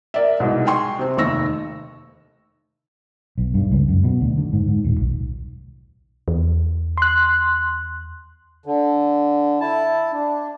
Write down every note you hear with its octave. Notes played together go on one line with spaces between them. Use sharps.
A#4 D5 E5
C2 G#2 B2
G5 G#5 C6 C#6
C3 C4
F1 D#2 D#3 C#6 E6 A#6
B1
G2
C#2
F#2
B2
D2
D3
G#2
G#2
D#1
B1
E2
C6 F#6
D3
E4 A5
D4